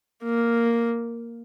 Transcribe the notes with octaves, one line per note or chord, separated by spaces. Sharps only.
A#3